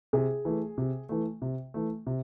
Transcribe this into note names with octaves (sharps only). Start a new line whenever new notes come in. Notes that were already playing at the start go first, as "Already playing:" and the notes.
C3 G#4
E3 A3
C3
E3 A3
C3
E3 A3
C3